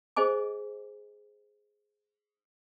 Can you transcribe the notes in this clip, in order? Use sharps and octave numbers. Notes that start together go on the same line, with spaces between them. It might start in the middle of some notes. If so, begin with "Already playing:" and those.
G#4 C5 D#5 G#5 D6